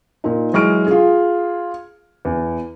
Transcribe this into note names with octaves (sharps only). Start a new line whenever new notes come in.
A#2 D#4
E3 F#3 G#3 C#6 F6 D7
F4 G#4
E2